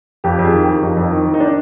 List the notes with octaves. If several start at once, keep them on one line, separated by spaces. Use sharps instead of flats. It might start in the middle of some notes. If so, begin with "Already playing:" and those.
F2 G4
F2
G#4
D#3
G4
D#3
F2 D#4
F2
D#3
D#3
D#4
D4